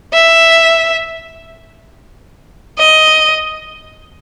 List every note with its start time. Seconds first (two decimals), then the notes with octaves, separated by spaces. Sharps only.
0.13 E5
2.78 D#5